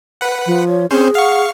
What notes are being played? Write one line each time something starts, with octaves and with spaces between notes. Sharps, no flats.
B4 F#5
F3
C#5
C4 C#4 G#4 C5
F5 F#5 C#6